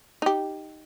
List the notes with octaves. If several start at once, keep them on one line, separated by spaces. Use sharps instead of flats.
D#4 G4